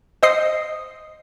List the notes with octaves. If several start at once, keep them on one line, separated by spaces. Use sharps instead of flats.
C5 D#5 D#6 C7